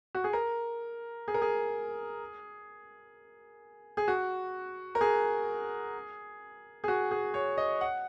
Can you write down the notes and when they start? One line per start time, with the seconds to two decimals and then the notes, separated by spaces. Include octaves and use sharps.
0.15 F#4
0.24 G#4
0.33 A#4
1.28 G#4
1.34 A#4
1.42 G#4
3.97 G#4
4.08 F#4
4.95 A#4
5.01 G#4
6.84 G#4
6.88 F#4
7.11 G#4
7.34 C#5
7.58 D#5
7.81 F#5